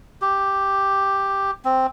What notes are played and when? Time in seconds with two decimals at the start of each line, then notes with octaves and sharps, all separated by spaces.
0.22 G4
1.65 C4